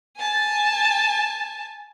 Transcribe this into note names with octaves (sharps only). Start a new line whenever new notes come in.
G#5 A5